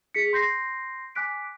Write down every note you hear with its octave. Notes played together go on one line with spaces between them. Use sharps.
G#4 B6 C#7
C6 G6 A#6 C7
G#5 D6 F#6 B6 D7